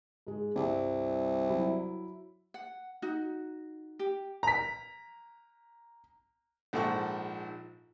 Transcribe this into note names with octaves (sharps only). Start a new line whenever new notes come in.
G#2 G#3
C2 G2
F#3 E4
F#5
D#4 F#4
G4
A#5 B6
A#1 G#2 F3 A4 F#5 C#6